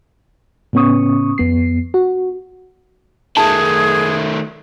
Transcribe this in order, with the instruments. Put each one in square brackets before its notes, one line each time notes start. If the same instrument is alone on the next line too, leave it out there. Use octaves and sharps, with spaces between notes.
[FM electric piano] A2 C#3 B3 C#4 C#6 D#6
F2 B3 C7
F#4
[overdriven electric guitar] D#3 A3 [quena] G#4 [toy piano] A5